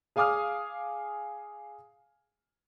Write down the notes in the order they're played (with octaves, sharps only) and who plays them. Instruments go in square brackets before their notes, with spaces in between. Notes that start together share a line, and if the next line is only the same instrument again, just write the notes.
[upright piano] G#4 F5 G#5 D6 D#6 F6